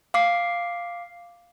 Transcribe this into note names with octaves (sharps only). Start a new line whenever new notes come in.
F5 D6 C7